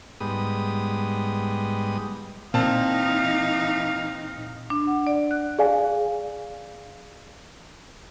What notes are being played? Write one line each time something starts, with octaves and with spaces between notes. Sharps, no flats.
G#2 G3 B3 D#6
A#2 E3 C4 D#4 F5 A5
D4
F#5
D5
F#6
G#4 D5 F5 G#5